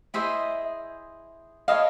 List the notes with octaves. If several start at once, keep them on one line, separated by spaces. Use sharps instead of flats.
E4 G#4 C5 D#5 E5
E4 A4 C#5 D#5 F5